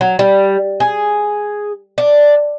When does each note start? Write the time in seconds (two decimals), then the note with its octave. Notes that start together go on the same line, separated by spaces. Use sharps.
0.01 F#3
0.19 G3
0.80 G#4
1.98 D4